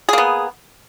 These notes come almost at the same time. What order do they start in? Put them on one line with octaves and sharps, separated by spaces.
G#4 A#3 B3